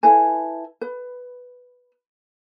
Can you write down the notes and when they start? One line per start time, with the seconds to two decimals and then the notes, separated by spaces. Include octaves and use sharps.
0.03 E4 A4 B4 G#5
0.81 B4